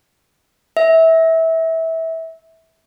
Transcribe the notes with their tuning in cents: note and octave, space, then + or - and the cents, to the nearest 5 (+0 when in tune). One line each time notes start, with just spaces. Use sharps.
E5 -20